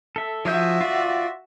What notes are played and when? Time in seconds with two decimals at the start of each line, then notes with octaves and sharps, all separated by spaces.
0.16 A4 E5
0.45 F3 F#4 G#4 E5 G6
0.81 F4 D5